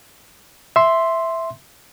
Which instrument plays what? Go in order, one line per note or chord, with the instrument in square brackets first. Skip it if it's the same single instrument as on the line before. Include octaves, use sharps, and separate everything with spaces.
[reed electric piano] E5 C6